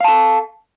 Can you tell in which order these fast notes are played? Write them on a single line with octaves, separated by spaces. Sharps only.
F5 A5 A4